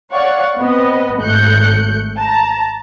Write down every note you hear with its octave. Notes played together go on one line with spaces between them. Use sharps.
C#5 D5 F5 F#5 C#6
B3 C4 B4 D#5
G#1 A3 F#6 G6 C#7
A5 A#5